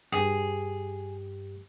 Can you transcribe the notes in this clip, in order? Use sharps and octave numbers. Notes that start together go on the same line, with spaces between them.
G2 G4 G#4